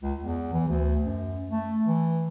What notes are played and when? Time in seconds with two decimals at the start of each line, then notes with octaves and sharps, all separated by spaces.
0.03 C#2
0.19 E2
0.53 E3
0.69 D2
1.05 F#2
1.51 A3
1.87 E3